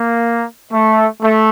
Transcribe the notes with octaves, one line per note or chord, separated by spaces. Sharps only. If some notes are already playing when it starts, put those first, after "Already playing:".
Already playing: A#3
A3
A3